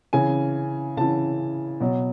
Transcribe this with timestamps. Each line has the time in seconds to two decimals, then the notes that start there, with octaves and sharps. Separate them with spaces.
0.13 C#3 E3 G#5
0.97 C#3 E3 A5
1.80 B2 F#3